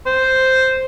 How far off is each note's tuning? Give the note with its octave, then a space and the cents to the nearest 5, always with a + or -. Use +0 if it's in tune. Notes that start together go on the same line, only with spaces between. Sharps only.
C5 -5